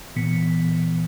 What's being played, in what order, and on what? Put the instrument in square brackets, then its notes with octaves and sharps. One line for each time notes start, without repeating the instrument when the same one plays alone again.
[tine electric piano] A#2 E3 B3 B6 C#7